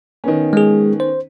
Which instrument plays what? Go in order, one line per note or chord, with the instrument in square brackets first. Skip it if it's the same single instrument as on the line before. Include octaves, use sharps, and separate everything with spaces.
[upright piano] D#3 B3 C#4
[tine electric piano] G#3 G#4
C5